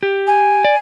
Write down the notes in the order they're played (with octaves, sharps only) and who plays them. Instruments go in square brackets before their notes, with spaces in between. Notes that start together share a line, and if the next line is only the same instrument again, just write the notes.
[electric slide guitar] G4
[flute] G#5
[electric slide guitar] D5